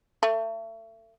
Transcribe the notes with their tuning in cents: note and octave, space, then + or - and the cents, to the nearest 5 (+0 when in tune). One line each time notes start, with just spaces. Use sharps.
A3 +35